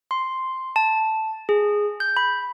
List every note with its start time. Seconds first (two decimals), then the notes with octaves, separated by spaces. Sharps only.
0.11 C6
0.76 A5
1.49 G#4
2.00 G6
2.17 B5